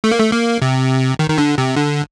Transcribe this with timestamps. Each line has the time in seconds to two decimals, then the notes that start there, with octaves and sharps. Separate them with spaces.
0.04 A3
0.11 A#3
0.19 A3
0.32 A#3
0.62 C3
1.19 D#3
1.30 D#3
1.38 D3
1.58 C3
1.76 D3